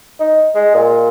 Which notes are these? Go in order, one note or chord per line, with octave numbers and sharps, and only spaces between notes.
D#4
G#3
A#2